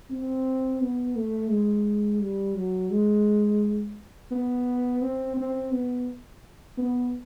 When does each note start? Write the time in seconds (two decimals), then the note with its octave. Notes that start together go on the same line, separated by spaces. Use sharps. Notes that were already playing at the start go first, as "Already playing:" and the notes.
0.11 C4
0.81 B3
1.16 A3
1.51 G#3
2.21 G3
2.56 F#3
2.91 G#3
4.31 B3
5.02 C4
5.37 C4
5.72 B3
6.78 B3